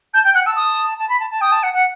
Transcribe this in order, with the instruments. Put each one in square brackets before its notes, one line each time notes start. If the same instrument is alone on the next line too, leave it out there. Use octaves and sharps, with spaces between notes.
[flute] A5 [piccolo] G6
[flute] G5 [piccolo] G6
[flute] F#5 [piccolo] F#6
[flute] A5 [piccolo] E6
[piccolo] D#6
[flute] A5
B5
A5
A5
[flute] G5 [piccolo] D#6
[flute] A5
F#5
F#5